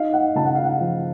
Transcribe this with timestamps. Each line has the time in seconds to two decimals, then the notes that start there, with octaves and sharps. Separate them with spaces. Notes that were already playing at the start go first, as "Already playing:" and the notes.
Already playing: D#4 F5
0.13 D#4 F#5
0.36 C#3 A5
0.45 F#5
0.55 F5
0.59 D#4 F#5
0.81 F3